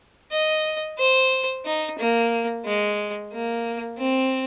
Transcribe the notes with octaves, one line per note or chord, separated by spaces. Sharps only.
D#5
C5
D#4
A#3
G#3
A#3
C4